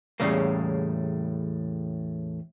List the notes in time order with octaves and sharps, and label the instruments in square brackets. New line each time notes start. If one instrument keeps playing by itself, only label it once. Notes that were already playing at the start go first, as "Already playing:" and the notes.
[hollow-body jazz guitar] E2 A2 C#3 G3 A#3